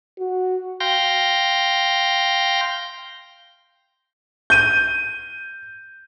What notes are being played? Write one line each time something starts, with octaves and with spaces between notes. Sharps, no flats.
F#4
F5 G5 C6 G6 A#6
G6 D#7